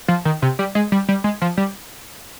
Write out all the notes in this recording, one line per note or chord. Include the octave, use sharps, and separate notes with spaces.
F3
D#3
C3
G3
G#3
G3
G3
G#3
F3
G3